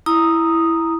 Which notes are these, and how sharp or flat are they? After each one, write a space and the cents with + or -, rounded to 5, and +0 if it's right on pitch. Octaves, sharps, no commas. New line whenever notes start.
E4 +0 A#5 +0 D#6 +0